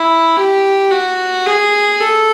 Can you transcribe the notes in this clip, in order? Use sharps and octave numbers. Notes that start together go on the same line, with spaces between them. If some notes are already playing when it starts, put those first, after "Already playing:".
Already playing: E4
G4
F#4
G#4
A4